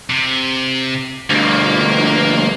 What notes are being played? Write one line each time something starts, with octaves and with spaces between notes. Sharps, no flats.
C3
D2 G2 A#3